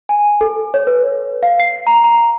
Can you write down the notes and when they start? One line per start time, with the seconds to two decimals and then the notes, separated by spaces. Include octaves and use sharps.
0.09 G#5
0.41 A4
0.74 C#5
0.87 B4
1.43 F5
1.60 C7
1.87 A#5
2.04 A#5